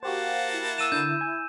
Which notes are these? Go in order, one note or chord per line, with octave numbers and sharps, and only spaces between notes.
A#3 F#4 G4 C5 F5 F#5 A5
E4
E6 D#7 E7
D3 G6
G#5